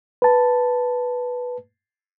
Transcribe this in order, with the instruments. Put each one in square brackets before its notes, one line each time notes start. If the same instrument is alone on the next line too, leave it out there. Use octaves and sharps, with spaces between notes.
[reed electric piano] B4 A5